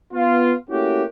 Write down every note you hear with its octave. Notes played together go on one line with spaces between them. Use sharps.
B3 F4
A3 A#3 C#4 E4 F#4 G4